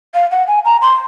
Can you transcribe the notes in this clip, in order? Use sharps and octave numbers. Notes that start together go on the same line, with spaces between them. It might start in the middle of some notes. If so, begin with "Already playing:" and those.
F5
F#5
G#5
A#5
C6